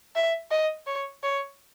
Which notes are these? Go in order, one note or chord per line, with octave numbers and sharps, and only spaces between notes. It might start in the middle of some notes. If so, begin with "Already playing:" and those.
E5
D#5
C#5
C#5